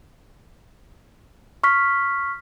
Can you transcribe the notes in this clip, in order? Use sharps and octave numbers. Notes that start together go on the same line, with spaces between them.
C#6 F6 B6